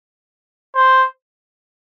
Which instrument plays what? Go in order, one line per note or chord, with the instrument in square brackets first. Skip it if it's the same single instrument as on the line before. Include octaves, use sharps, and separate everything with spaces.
[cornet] C5